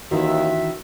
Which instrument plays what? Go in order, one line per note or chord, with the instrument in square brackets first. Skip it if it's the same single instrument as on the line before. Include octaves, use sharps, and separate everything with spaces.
[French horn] D#2 [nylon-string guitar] D#3 E3 C#4 [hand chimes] F#4 [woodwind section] E5